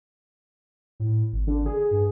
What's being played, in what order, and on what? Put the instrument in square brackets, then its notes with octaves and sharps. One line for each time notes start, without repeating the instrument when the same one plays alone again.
[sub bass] A2
G#1
[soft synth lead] D3
G#4
[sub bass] G2